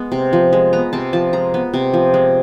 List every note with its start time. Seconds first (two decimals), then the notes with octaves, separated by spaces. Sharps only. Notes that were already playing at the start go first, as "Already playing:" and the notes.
Already playing: G#3 B3
0.12 C3
0.33 F3
0.53 G#3
0.73 B3 A#5
0.93 C3 A5
1.13 F3 A5
1.33 G#3 A#5
1.54 B3
1.74 C3
1.94 F3
2.14 G#3